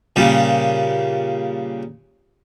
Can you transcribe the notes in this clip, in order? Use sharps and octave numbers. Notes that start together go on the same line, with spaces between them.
A#2 C#3 G3